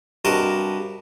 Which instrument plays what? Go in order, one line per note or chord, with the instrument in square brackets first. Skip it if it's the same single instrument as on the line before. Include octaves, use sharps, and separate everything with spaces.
[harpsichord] G2 C3 F#4 A#4 D#5 A5